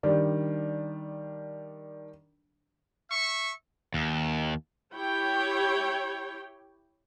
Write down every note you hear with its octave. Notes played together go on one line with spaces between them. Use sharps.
D#3 G3 D4
E5 C#6
D#2
E4 G4 C#5 G5